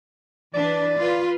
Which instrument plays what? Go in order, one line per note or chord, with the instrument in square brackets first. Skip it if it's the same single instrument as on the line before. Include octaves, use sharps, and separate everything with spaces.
[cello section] E3 D4 B4 [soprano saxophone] D5
[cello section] F4 B4